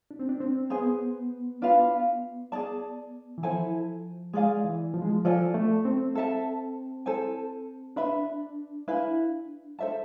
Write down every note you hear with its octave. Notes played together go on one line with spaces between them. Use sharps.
D4
C4
D4
C4
B3 G#4 C5 G#5
D4 F4 B4 F5
G#4 D5 A5
E3
F3 E4 A4 C5 G#5
G#3 G#4 D5 F5 G#5
E3
F3
G#3
F3
F3 F4 A4 D5 G#5
A3
C4
A4 E5 A5
A4 C5 G#5
D4 B4 E5 B5
E4 B4 F5 G#5
A4 C5 E5 A5